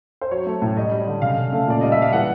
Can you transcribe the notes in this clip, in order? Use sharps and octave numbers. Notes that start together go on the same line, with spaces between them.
C5
F#3 C#5
A3
A2
G3 D#5
G3
D3
C#3 F5
C#3
A3
A#2 D5
G3 D#5
E5
G3 F5
E3 F#5